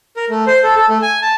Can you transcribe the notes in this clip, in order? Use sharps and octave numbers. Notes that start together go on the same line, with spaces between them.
A#4
A3
C5
A4
A4
A3
G#5
A5